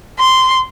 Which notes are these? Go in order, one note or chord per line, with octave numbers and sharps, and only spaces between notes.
C6